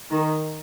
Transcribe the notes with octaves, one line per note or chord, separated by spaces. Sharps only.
D#3